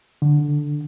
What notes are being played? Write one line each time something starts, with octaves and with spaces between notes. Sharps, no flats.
D3